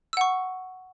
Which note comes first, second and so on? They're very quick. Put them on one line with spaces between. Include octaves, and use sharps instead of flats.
E6 F#5 C#6